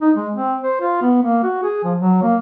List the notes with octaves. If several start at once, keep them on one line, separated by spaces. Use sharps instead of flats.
D#4
G#3
C4
C5
F4
B3
A#3
F#4
G#4
F3
F#3
A#3